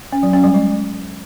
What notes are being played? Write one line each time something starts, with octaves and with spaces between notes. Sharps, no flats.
C#4
F#3
C#4
G3
G#3